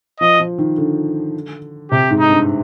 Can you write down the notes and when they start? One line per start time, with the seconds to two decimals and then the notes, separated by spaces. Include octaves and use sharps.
0.20 F3 D#5
0.40 F3
0.58 D#3
0.77 D3
1.91 C3 G4
2.10 G#2
2.19 D#4
2.29 G2